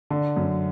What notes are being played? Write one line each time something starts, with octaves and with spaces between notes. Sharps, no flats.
D3
F#2